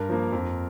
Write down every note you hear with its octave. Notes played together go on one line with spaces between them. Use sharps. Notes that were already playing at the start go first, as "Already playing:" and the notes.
Already playing: G2 A#4
F3 A#3
F2